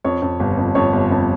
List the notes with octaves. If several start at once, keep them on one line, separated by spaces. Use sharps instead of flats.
F2 C#5
F2
G1
F2
F2 C#5
G1
F2